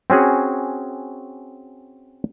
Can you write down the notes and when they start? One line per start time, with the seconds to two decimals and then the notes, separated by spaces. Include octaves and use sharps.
0.10 C4 C#4 F#4 G#4